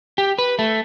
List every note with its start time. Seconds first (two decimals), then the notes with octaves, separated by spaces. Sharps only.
0.18 G4
0.39 B4
0.59 A3